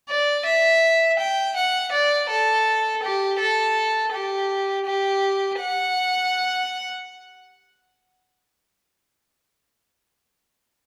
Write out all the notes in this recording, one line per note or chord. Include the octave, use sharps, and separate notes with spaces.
D5
E5
G5
F#5
D5
A4
G4
A4
G4
G4
F#5